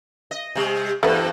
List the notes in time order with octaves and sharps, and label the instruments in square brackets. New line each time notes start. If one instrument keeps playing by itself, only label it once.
[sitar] D#5
C3 G3
[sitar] E2 G2 [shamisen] A3 B3